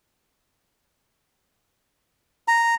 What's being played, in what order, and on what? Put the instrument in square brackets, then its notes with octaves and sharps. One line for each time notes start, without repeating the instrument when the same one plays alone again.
[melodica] A#5